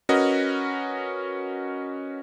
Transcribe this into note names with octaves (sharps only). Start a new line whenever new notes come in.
C#4 F#4 A#4 B4 D#5